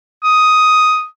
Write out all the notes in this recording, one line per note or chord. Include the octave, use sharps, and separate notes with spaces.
D#6